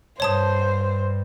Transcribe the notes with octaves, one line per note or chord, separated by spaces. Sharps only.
G2 C5 C#5 A5 D#6